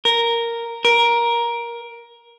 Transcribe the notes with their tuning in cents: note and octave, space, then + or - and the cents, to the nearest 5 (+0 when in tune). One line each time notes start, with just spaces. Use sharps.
A#4 -5
A#4 +15